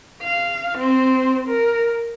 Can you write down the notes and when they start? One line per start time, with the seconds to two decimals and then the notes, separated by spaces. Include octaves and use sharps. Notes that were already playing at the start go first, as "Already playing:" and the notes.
0.23 F5
0.78 C4 C5
1.48 A#4